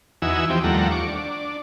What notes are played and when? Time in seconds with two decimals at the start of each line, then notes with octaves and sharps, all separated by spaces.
0.22 E2 E3 D#4 F#4 G#5 E6
0.50 F3 C4 G4
0.64 D#2 F3 G3 A3 F#5 A#5
0.92 C#6 D6
1.07 D4